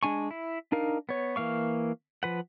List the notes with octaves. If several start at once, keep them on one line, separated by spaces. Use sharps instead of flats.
G#3 D4 G#5 C#6
E4
D4 D#4 A#4 F5
B3 C#5
E3 A#3 F5 C#6
F3 B4 F#5